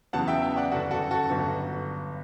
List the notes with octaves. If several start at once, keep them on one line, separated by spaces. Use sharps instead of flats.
E2 C#3 F#3 B3 F#5 A5
E5 G5
E5 G5
D5 F#5
G1 F#2 C#3 F#4 A4
F#4 A4
F#4 A4
G1 G2 F#3 B3